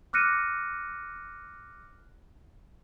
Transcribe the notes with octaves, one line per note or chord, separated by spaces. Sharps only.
D6 F6 F#6 A#6 C#7 D#7